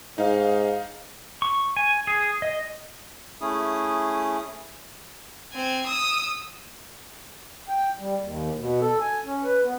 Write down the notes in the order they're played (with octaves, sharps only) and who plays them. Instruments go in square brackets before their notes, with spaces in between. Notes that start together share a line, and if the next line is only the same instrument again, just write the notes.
[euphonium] G#2 [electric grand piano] D#4 F5
[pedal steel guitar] C#6
G#5
G#4
D#5
[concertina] A3 C#4 E4 G#4 D#6
[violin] C4 G#5
D#6 E6
[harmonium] G5
G3
D#2
B2
A4
G#5
C#4
B4
B3